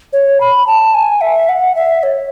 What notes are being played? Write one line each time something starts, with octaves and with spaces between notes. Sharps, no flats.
C#5
B5
A5
G#5
E5
F#5
E5
C#5